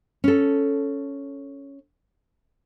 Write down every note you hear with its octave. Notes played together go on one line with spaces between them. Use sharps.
C#4 A4